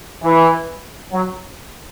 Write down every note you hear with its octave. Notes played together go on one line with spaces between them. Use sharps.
E3
F#3